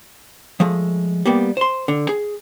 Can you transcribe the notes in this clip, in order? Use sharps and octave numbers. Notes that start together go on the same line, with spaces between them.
F3 G#3 A3
G3 A#3 B3
C5 C6
D3
G#4